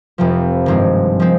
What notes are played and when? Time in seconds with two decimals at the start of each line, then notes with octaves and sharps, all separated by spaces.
0.18 F1 F2 C3 F3
0.66 G#1 G2 F3 G#3 C4
1.20 F3 G#3 C4